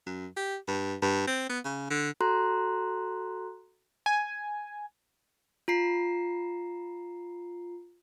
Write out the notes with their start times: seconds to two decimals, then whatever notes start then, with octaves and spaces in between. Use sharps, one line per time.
0.06 F#2
0.36 G4
0.68 G2
1.02 G2
1.27 C4
1.49 B3
1.65 C#3
1.90 D3
2.21 F#4 A4 A#5 C6 F#6
4.06 G#5
5.68 F4 A#5 C7